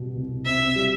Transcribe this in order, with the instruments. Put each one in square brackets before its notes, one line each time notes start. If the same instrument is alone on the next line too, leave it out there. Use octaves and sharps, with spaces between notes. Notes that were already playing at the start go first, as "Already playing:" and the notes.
Already playing: [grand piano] B2 G3
C2
[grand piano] C4 [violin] E5
[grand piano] G3